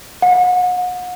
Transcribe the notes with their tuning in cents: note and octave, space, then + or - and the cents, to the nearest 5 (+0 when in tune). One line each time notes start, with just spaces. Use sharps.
F#5 -35